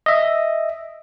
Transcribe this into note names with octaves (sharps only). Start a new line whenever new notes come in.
D#5 E5